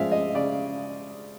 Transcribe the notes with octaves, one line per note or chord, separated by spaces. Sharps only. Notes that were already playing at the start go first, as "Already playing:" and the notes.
Already playing: F3 G#3 D5 E5 F5
D#5
C#3 D5